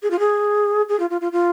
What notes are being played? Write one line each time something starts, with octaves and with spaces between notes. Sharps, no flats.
G#4
F4
G#4
G#4
F4
F4
F4
F4